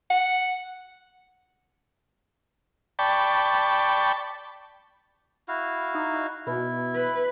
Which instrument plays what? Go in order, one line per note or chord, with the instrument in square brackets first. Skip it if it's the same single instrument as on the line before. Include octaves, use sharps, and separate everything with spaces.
[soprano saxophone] F#5
[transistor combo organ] D5 G5 A5 B5 C#6
[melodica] E4 F#4 F5
[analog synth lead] D#4
[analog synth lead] B2 [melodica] E4
[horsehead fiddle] B4